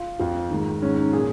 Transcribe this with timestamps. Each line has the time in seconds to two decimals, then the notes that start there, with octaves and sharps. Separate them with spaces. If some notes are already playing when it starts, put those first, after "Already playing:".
Already playing: F4
0.19 F2 F3
0.50 G#2 D#3
0.82 G#2 D#3 C#4
0.97 D#4
1.13 A#2 F3 G#4